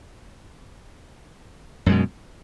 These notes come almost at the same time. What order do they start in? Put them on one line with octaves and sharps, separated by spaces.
F#2 G#3 B2